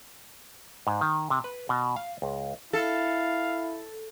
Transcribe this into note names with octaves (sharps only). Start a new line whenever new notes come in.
G#2
D#3
C3
B4
B2
F5
C#2
E4 A4 F5